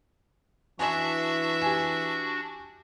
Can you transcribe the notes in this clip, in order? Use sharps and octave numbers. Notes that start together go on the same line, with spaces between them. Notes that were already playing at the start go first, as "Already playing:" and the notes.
E3 D4 F#4 E5 G#5
G4 G#5